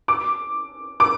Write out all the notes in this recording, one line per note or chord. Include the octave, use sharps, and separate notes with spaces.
D6
D6